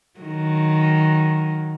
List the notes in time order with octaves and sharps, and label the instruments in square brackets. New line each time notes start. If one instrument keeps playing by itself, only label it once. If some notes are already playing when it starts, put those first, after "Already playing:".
[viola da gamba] D#3 F#3